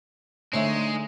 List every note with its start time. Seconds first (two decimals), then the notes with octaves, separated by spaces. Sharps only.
0.53 D3 G#3 A3 D#4 C5 C#5 E5